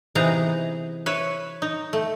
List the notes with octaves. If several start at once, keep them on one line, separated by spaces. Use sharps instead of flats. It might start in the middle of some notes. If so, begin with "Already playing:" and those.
C3 E3 B3 D#4 G#4 A#5
B4 C#5 E5
D#4
A3